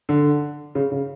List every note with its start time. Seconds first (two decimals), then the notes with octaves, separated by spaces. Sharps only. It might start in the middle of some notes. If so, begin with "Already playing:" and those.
0.09 D3
0.75 C#3
0.92 C#3